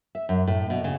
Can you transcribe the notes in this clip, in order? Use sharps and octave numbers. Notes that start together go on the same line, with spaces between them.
E5
F#2
A2
B2
C#3